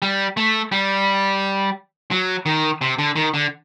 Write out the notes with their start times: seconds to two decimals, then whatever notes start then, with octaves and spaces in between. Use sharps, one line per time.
0.02 G3
0.37 A3
0.72 G3
2.11 F#3
2.46 D#3
2.81 C3
2.98 D3
3.16 D#3
3.34 D3